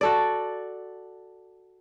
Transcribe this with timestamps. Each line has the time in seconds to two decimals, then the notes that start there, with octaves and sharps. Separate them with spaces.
0.01 F#4 A4 D5